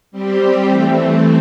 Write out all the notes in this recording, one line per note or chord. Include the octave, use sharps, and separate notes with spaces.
G3 C4 G4
E3 A3 C4